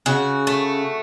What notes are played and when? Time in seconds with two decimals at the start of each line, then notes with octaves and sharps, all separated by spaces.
0.06 C#3 F#4
0.47 A3